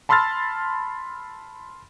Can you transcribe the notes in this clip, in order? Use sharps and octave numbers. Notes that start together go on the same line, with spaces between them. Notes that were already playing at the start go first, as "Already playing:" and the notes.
A5 B5 C6 E6 F6 A6